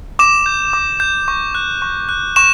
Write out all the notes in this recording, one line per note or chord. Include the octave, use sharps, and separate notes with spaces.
D6 E7
G6
D6
G6
C#6
F#6
C#6
F#6
C#6 E7